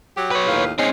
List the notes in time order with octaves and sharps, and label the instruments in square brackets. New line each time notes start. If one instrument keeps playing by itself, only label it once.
[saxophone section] F#3 G4
[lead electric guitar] B4 C#5
[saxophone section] D#2 A2 F4
[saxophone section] G#3 D#4 [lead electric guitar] C4 C#4